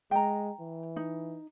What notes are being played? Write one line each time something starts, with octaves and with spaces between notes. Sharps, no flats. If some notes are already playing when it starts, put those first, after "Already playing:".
G#3 G5 A#5
E3
D#4